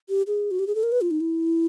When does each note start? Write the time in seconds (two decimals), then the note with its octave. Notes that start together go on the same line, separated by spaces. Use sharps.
0.09 G4
0.27 G#4
0.51 F#4
0.59 G4
0.67 G#4
0.75 A4
0.83 A#4
0.92 B4
1.01 F4
1.11 D#4
1.20 E4